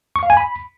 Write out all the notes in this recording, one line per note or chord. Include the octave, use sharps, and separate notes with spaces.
C#6
F5
G#5
B5